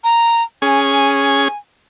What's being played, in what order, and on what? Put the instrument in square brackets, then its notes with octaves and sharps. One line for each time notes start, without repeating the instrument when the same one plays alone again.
[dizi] A#5
[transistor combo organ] C#4 G#4 [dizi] G#5